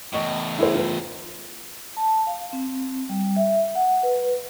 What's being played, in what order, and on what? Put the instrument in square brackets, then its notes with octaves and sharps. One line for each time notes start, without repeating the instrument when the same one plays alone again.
[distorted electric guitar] E2 A2 [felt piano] D#5 C#6
[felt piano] E4 G#4 C5
F4 B4
[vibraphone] A5
F5
C4
G3
E5
F#5
B4